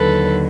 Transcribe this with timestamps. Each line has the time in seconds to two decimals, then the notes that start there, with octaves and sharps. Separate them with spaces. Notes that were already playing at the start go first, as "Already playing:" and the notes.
Already playing: D#2 D3 F#3 A4 B4